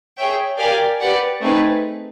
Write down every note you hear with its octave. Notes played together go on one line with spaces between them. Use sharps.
G#4 C#5 E5 G5
G4 A#4 D5 F5 G#5
G4 B4 D5 F#5
A3 C4 D#4 G#4 B4